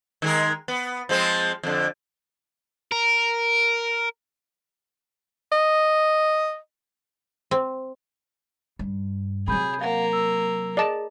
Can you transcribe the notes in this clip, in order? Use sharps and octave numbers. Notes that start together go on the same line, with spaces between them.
D#3 G#3 A#4
B3
F3 G#3 C4
F2 D3
A#4
D#5
C4
G2
C3 F#3 G#4 B5 G6
A#3 F5 F#5
E6
G#4 D5 D#5 A5